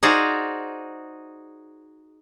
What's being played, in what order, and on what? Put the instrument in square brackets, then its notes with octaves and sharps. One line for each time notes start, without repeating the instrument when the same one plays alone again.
[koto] D#4 F#4 G#4 C5 D5 F5